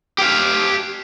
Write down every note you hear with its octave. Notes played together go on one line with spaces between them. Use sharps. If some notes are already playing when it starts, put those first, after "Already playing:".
G4 F5